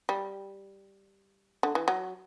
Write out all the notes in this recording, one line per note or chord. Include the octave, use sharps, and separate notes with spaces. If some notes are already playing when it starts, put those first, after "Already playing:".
G3
D3
E3
F#3